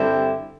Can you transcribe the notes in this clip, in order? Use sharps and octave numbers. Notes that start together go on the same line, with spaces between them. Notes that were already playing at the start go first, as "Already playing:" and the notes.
Already playing: G2 D3 G3 C4 E4